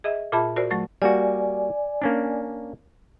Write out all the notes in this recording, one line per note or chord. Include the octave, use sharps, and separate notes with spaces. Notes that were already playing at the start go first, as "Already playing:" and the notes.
G#4 D#5 E5
A#2 F4 G#4 E5 A5 B5
F#4 A#4 C5 D5
F#3 A3 C#6 A6
G3 A#3 F#4 D5 G#5
A#3 C#4 D4